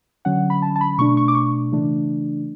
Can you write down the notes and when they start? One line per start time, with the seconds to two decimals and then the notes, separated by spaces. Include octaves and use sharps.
0.25 D3 F#3 C#4 F#5
0.50 B5
0.62 A5
0.76 A5
0.81 B5
0.98 B2 A3 D4 C#6
1.17 C#6
1.28 D6
1.35 C#6
1.72 C#3 E3 A3 D4